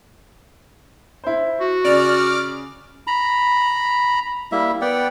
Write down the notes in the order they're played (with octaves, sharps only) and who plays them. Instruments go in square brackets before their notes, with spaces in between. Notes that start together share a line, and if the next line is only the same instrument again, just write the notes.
[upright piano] E4 C5
[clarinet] F#4
[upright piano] C#3 [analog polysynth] D5 F6
[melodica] A#5 B5
G3 A#3 E4 E5
B3 D5 F#5 G5